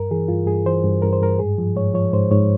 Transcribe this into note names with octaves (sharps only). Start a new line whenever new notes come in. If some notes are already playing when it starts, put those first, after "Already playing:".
Already playing: G2 A#4
E3 G#4
G2 F4
G2 G#4
E3 C5
G2
G2 A#4
C5
G2 A#4
G#2 G#4
F3
G#2 C#5
F3 C#5
G#2 C5
G#2 C#5